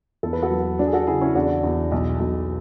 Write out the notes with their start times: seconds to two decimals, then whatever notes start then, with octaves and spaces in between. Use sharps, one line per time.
0.23 E2 A4
0.33 B4
0.42 F#4 A4
0.51 F#3
0.79 F#3 D4 F#4
0.87 G#4
0.93 F#4 A4
1.07 C#3 E4 G#4
1.21 C#4 E4
1.35 E2 D4 F#4
1.64 E2
1.92 B1
2.20 B1